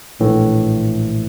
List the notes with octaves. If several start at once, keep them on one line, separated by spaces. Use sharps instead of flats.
A#1 A2 E3